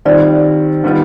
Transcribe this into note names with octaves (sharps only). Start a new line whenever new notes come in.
D#3 G3 C4 F4 D5
D#3 G3 B3 F4